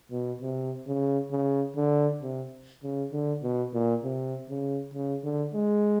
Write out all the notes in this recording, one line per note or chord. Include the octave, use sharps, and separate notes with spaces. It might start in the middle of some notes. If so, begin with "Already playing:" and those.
B2
C3
C#3
C#3
D3
C3
C#3
D3
B2
A#2
C3
C#3
C#3
D3
G#3